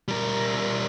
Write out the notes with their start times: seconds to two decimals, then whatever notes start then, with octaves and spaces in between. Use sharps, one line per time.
0.08 G3 A#4